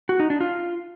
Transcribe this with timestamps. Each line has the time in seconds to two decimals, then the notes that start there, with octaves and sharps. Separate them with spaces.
0.09 F#4
0.20 D#4
0.30 D4
0.41 F4